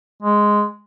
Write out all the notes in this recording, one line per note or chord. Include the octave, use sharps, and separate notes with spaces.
G#3